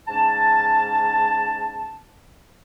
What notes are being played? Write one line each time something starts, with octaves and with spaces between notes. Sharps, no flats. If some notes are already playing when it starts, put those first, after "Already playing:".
G#2 C#4 A5